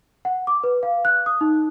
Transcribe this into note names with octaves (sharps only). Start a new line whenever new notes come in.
F#5
D6
B4
F5
F#6
D#6
D#4